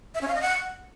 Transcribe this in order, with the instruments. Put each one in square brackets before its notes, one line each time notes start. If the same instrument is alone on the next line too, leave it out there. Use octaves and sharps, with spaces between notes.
[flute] E5
C#4
F5
D#5
F#5